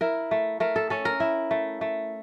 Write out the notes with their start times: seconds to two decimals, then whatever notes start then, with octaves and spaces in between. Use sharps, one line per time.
0.01 E4 A#4
0.31 A3
0.60 A3 A#4
0.76 A4
0.90 C#4 A4
1.05 A#4
1.20 E4
1.51 A3
1.81 A3